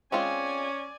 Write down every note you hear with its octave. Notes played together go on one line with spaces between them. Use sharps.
G#3 C4 C#4 F4 D5 G#5